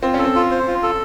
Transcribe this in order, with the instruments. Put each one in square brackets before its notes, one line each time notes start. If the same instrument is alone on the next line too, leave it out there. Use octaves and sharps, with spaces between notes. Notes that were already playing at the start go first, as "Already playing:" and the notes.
[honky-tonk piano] C4 [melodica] F4
[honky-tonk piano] C#4 [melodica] A4
[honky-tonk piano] C4
[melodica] F4
C5
F4
A4